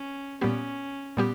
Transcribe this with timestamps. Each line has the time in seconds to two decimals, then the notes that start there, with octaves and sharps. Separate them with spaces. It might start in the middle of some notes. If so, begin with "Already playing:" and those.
Already playing: C#4
0.41 A#2 G3 B3 C#4 G4
1.17 A#2 G3 B3 G4